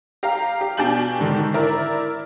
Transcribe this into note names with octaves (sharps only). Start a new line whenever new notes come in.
G4 F5 A#5
G4
B2 D4 G4 G#5 G6 F#7
G#2 D3 D#3
E4 A#4 D5